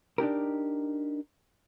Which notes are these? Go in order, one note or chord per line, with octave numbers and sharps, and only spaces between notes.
D4 D#4 G4 A#4